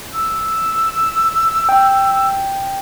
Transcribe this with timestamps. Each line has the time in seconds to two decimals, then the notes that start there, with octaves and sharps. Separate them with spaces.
0.14 E6
1.69 G5